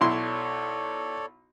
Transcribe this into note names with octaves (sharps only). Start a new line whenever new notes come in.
B1 E4 A4 C#5 D5 C6